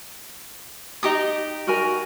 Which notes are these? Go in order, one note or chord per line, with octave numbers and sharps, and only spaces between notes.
D#4 G4 D#6
F#4 A#4 G#5